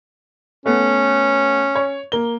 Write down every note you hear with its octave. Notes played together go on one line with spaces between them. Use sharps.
A3 B3 C#4
C#5
A#3 G7